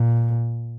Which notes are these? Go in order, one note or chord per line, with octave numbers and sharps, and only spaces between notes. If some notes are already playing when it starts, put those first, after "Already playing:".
Already playing: A#2